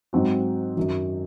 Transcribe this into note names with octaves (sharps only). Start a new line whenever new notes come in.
G#2 F#3 C4 F#4
F#2 D#3 F#3